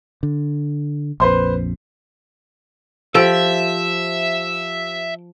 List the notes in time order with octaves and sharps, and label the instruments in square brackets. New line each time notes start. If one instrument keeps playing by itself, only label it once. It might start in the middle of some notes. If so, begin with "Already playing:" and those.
[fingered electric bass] D3
[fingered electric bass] A#1 F2 [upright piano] B4 C5 C6
[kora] F3 [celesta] G4 C5 [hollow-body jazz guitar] A4 G5 [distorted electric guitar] E5